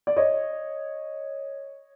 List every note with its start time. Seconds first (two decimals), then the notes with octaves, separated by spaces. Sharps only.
0.07 D5
0.16 C#5 D#5